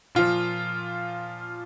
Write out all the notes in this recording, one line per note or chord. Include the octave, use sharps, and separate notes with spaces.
A#2 F3 F4